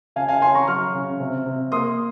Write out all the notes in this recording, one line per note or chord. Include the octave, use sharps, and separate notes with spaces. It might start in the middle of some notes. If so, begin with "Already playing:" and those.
C#3 F5 G#5
F5 G#5
C#4 G#5 C6
A#5 C#6
F#3 C#6 F6
C#3
C3
C3
A#3 C6 D#6